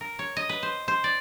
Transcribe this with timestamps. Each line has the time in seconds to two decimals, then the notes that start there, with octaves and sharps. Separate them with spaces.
0.01 A#4
0.19 C#5
0.37 D#5
0.49 B4
0.63 C5
0.88 C5
1.04 D5